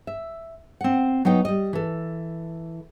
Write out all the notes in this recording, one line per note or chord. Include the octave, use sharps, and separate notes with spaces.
E5
C4 F#5
F#3 B3 D#4 G5
G3 D#5
E3 A4